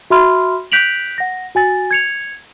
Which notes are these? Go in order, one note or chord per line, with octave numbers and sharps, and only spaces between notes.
F#4 E5 B5 C6 F6
F#6 G6 B6 D7 F7 F#7
F#5 A#6
F#4 G#5 A6
G#6 C#7 F7